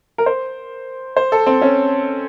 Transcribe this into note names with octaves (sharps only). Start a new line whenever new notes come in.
A#4
C5
C5
A4
C4
C#4